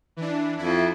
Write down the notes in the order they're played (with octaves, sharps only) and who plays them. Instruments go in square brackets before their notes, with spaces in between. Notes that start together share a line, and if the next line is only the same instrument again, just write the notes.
[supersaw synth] E3 D4
[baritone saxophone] F2 [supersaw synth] E4